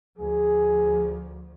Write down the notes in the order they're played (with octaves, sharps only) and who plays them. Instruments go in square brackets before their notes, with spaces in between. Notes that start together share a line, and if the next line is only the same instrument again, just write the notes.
[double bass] D2 F3 [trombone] G#4